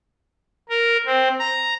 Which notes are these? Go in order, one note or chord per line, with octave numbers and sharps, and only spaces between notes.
A#4
C4
A#5